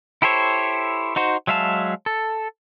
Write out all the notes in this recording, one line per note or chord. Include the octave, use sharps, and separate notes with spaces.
E4 G4 A4 C5 C#5
D#4 F#4 C5
F#3 G#3 E5 F5 A5
A4